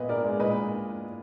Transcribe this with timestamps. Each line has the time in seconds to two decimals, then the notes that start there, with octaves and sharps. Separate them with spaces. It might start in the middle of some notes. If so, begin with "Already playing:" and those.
Already playing: A#2 A#3 B3 B4 D#5
0.09 D4 A#4 D5
0.24 G#3
0.39 A#2 B4 D#5